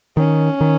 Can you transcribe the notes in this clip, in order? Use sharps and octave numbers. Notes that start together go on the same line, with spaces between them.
D#3 C#4
D#3